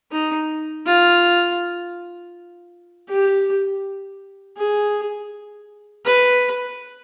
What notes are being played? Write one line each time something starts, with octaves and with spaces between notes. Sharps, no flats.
D#4
F4
G4
G#4
B4